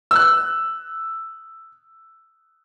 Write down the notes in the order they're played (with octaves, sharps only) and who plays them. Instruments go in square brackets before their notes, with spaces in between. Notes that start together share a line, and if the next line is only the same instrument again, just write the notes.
[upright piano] E6 F#6